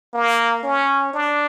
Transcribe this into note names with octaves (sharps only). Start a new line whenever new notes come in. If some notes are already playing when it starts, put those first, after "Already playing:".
A#3
C#4
D4